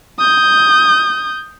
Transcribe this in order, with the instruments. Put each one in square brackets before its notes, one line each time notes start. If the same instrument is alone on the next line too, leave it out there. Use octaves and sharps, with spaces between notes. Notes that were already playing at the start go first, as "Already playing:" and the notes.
[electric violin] D#6 G6